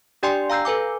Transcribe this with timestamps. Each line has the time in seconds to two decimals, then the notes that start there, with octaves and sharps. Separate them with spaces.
0.23 D4 G4 D5 G5 G#5 C6
0.50 F5 A#5 E6 G6 C7
0.65 A4 B4 G#5 D6